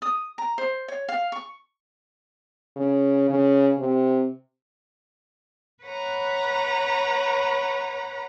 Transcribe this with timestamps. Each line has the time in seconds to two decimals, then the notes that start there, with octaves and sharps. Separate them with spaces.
0.02 D#6
0.38 A#5
0.58 C5
0.88 C#5
1.08 F5
1.32 C#6
2.77 C#3
3.30 C#3
3.79 C3
5.84 B4 C#5 F#5 A#5 B5